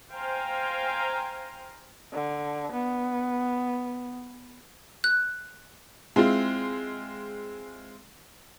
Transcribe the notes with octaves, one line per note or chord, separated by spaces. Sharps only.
C5 F5 G5 G#5 A#5
D3
B3
F#6
G#3 C4 E4 F4